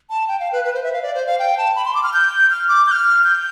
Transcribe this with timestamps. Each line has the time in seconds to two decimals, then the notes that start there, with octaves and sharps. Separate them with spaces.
0.10 A5
0.28 G5
0.40 F5
0.52 B4
0.65 B4
0.74 C5
0.83 E5
0.93 F5
1.03 D5
1.15 C5
1.27 F5
1.39 G5
1.58 A5
1.76 B5
1.85 C6
1.94 D6
2.03 F6
2.14 G6
2.51 F6
2.68 D6
2.86 G6
2.91 F6
3.24 G6